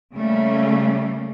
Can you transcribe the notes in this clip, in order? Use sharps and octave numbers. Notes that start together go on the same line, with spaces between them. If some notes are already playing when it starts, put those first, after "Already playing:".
C#3 G3 A3 A#3